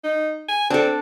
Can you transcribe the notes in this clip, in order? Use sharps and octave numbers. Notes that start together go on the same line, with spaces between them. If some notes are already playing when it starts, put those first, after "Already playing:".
D#4
G#5
C4 D4 A4